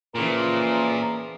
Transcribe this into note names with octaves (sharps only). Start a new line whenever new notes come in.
A#2 C#3 E3 F3 A#4